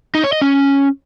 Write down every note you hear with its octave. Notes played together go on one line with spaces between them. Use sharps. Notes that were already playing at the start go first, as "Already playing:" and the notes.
D#4
C#5
D#5
C#4